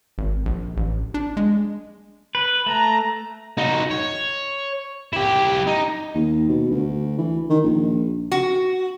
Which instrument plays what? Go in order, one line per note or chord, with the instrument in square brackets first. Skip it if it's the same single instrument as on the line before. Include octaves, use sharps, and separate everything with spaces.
[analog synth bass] G#1
A#1
A1
D4
G#3
[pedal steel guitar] B4
[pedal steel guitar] A3 [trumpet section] A#5
[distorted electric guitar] D#4 F#4
C#5
E4 G4
D#4
[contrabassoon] D#2
B2
D2
E3
D#3
A#1
[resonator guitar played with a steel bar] F#4